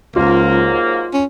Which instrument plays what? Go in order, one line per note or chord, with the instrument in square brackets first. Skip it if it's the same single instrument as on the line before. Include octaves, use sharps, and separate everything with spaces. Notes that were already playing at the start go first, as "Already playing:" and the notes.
[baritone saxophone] C#2 [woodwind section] G#2 F#3 A#3 [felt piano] F4
[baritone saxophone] C#4